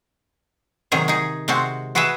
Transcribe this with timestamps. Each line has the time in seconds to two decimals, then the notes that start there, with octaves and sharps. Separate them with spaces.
0.92 C3 D#3 F#3 G#4
1.08 D#4 G#4
1.48 C3 G#3 C4 F#4
1.95 F#4 G#4 B4 D#5 E5